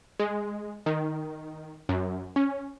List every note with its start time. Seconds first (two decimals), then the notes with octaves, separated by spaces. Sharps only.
0.20 G#3
0.86 D#3
1.89 F#2
2.36 C#4